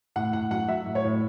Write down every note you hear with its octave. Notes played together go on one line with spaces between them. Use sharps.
A2 F#5
A2 F#5
F#3 F#5
F#3 E5
A2
C#5
A2